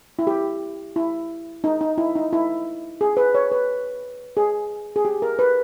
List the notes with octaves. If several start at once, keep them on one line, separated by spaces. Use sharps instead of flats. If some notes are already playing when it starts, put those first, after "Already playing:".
E4
G4
E4
D#4
D#4
E4
D#4
E4
G#4
B4
C#5
B4
G#4
G#4
G4
A#4
B4